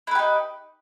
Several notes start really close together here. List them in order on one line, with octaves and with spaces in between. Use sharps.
E4 B4 G4 D#4